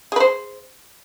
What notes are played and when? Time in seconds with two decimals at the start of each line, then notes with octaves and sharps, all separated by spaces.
0.12 G#4
0.16 B4
0.20 C5